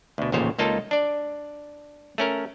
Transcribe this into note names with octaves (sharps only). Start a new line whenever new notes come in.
D2 B2
A1 D#2 A#2 C#3 C5 C#5
C#2 A#3 D#4 F4 A4 A5
D4 D5
A3 C#4 A#4